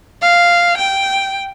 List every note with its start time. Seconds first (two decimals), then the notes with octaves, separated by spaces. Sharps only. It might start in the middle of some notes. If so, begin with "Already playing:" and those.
0.22 F5
0.78 G5